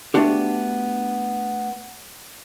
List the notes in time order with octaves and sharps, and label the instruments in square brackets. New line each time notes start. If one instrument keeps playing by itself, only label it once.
[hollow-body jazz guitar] A3 B3 D4 F#4 G4